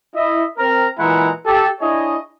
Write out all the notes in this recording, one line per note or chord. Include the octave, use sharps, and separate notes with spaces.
E4 D#5 E5
C4 A#4 A#5
A#2 E3 G#3 E4 F#5 A#5
G4 A4
D4 E4 G#4 C#5 D#5